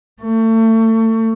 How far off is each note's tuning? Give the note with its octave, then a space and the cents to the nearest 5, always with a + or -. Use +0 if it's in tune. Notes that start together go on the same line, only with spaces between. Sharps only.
A3 +30